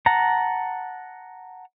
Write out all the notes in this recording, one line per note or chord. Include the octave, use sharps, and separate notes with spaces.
F#5 A5 A#5